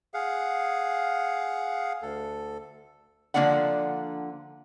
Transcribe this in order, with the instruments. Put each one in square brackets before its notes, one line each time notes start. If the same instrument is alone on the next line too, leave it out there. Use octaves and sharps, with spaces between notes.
[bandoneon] G#4 F5 F#5
D2 A4
[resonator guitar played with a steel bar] D3 F3 A#3 D4 D5 F#5